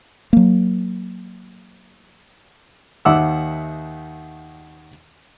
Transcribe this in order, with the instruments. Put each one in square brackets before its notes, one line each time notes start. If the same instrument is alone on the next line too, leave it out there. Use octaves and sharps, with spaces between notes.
[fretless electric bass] F#3 A#3
[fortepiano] D#2 D#3 E5 F#5 D6 E6